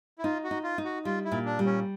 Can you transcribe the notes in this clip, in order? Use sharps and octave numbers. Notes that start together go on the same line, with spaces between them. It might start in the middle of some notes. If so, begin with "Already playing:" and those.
E4
D#4 F4
F#4
D#4
F4
D#4
F#4
G3 F4
E4
A#2
D4
G3
C#4